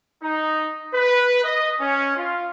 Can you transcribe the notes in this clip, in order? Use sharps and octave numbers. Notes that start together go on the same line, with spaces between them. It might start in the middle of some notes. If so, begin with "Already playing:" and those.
D#4
B4
D#5
C#4
F4